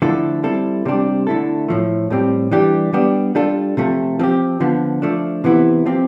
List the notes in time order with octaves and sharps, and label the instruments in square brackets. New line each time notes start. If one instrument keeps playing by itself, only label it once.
[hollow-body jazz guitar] D3 F3 A3 E4 A4
G3 C4 E4 A4
C3 G3 D4 G4
D3 A3 E4 A4
A2 F3 A3
A2 G3 C4 G4
E3 G3 D4 G4
G3 B3 D4 G4
G3 D4 F4 A4
C3 F3 A3
F3 C4 G4
D3 F3 B3
F3 A3 D4
C3 E3 B3 E4
F3 C4 G4